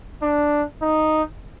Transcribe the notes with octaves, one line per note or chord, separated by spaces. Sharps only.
D4
D#4